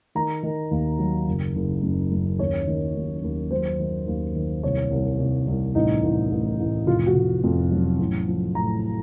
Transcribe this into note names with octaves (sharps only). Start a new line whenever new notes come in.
D#3 A#5
D#3
D#2
F#3
F#1
F#1
F#2
F#2
D#2 C#5
D#3
D#2
D#2
F#3 C5
D#3
D#2
D#3
C2 C#5
C2
C2
C2
A1 D#4
A1
A1
A1
F1 F4
F#4
F1
F2
F#3
A1
F3
A2 A#5